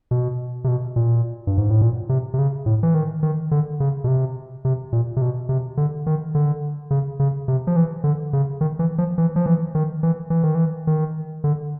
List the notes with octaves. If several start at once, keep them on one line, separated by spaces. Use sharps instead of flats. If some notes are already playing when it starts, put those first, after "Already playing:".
B2
C3
B2
A#2
G2
G#2
A2
A#2
C3
C3
C#3
A2
E3
D#3
D#3
D3
C#3
B2
C3
C3
A#2
C3
B2
C3
D3
D#3
D3
C#3
C#3
C3
F3
E3
D3
C#3
D#3
E3
F3
E3
F3
E3
D#3
E3
E3
D#3
E3
D#3
D3